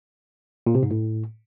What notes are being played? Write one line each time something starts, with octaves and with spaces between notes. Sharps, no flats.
A#2
C3
G#2
A2